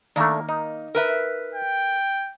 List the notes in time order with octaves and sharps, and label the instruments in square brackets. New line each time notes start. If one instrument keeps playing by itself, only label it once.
[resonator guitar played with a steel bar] D#3 A#3 [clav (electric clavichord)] A3 D4
[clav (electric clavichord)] D#4
[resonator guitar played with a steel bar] A#4 B4 E5
[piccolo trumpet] G5